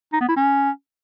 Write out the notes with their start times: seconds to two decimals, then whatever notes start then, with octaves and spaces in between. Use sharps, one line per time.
0.13 D#4
0.21 B3
0.29 E4
0.36 C#4